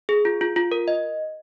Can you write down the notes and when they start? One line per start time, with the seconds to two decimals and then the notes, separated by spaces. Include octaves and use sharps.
0.09 G#4
0.25 F4
0.41 F4
0.56 F4
0.72 A#4
0.88 D#5